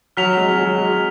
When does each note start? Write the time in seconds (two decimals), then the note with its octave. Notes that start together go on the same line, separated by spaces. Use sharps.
0.17 F#3 F6 B6 F7
0.37 G#3
0.57 F#3
0.78 G#3